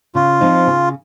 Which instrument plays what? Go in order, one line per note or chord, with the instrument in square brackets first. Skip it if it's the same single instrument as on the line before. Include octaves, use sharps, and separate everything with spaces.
[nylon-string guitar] C#3 [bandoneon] F4
[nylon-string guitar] F3 C4 D#4
C#3